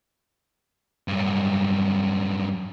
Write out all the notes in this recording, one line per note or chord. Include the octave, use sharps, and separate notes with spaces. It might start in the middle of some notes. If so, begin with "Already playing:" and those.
G2 F#3